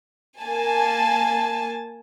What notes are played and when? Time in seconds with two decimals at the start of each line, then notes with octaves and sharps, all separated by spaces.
0.40 A#3 G#5 A5